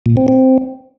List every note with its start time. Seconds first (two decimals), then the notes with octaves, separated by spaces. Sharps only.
0.06 A#2
0.17 C4
0.28 C4